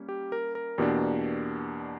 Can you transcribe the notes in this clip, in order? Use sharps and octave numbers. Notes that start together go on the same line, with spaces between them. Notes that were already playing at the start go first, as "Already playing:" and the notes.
Already playing: G3 A#3 C#4
G4
A#4
A#4
E2 B2 A#3 D4 G4